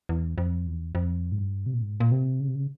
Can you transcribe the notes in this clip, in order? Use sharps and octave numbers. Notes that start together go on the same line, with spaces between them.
E2
F2
E2
F2
G#2
G2
C3
A#2
G#2
A#2
C3
C#3
C3
C#3